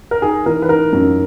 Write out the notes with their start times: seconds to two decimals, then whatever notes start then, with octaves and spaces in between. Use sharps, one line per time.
0.11 A#4
0.22 D#4 G#4
0.46 E3 A#4
0.62 B4
0.69 D#4 A#4
0.93 F#2